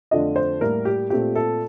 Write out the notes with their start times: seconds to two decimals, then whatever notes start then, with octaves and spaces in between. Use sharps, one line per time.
0.11 F2 D3 A3 D4 F4 D#5
0.36 C5
0.61 A2 G3 A#3 A#4
0.85 G4
1.10 A#2 A3 C4 F4 G4
1.35 A4